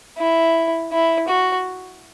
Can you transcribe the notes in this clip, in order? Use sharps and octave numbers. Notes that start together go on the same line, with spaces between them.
E4
E4
F#4